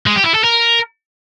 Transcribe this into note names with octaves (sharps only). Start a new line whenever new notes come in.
G#3
G4
E4
A4
A#4